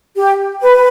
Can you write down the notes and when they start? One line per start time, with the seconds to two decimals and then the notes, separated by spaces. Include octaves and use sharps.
0.17 G4
0.61 B4